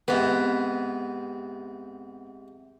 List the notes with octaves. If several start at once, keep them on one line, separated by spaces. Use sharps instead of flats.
G#2 C3 B3